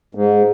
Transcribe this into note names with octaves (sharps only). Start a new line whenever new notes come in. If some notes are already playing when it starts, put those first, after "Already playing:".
G#2